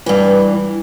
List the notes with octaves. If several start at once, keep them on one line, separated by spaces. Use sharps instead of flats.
G2 E3